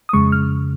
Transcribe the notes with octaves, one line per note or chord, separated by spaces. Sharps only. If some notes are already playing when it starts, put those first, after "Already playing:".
D#6
F2 C#3 G#3 C#6
F6